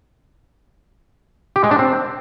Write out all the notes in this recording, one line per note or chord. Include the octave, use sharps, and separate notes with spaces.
G4
G#3
D4
C4